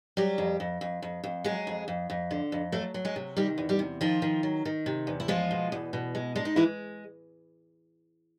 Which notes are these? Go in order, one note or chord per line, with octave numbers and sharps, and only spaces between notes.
F#3 G3 G4
F2
F2
F2
F2
F2
F#3 G#3 G#4
F2
F2
F2
D3
F2
F#3 A3 A4
F#3
G#3 G#4
C3
D#3 G3 G4
E2
G3 G4
C3
D#3 F3 F4
D#3
F#3
D#3
C3
E2
E4
F3 G#3 F4
B2
E2
B2
G#3
G#3 D4
D#4
E3 G#3 E4